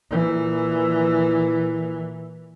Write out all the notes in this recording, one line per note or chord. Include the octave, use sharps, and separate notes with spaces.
A#2 E3